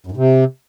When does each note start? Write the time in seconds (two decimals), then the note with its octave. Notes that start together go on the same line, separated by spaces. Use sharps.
0.07 F#2
0.12 G#2
0.17 C3